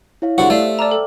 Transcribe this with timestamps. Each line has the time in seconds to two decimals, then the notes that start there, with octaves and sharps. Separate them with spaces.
0.22 E4 C#5 F5
0.38 D3 F#4 G4 C5 E5 C#7
0.50 A3 D5 F5
0.63 C5 E6
0.79 D5 E5 A5 A#5 D6 F6
0.91 A4 G5